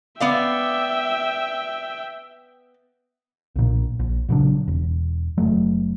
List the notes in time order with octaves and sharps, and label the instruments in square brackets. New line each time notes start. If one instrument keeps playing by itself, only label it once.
[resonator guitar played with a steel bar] B3 D5 F5 [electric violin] E5 G5
[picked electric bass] B1 A#2
A#1
A#2 C#3 F#3 D4
E1
F#1 F#3 A3